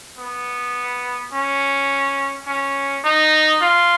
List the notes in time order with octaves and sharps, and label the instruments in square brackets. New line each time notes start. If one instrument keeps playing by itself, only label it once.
[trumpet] B3
C#4
C#4
D#4
F4